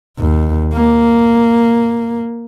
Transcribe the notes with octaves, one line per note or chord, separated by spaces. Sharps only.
D#2
A#3